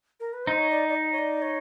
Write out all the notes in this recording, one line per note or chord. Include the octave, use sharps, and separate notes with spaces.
A#4
B4
D#4 C5
C#5
D5
D5
D#5
C#5
D5
C#5